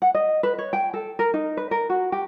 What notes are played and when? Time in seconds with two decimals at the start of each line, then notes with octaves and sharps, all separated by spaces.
0.02 F#5
0.14 D#5
0.43 B4
0.58 C#5
0.73 G5
0.94 A4
1.19 A#4
1.34 D#4
1.57 B4
1.71 A#4
1.90 F#4
2.12 G4